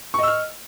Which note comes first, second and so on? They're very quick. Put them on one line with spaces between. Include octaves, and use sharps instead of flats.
C#6 D#5 E6 F6